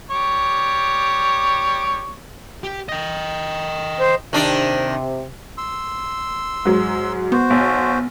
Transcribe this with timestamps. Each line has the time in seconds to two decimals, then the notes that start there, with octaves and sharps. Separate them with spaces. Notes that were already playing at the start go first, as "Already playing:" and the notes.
0.11 G3 C#5 D6
2.64 G4
2.89 D#5 G5
4.00 C5
4.33 C3 D#3 D4 D5
5.58 C6 E6
6.65 G#2 F#3
7.32 B3 F#4 C5
7.50 B1